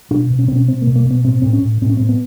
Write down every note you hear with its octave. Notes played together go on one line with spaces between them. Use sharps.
B2 D4
B2
C#4
B2 C4
C#4
B2 C4
A#3
B2
A#3
B2 B3
A2 C4
A2 C4
C#4
A2
A2 C4
C#4
A2 C4
B3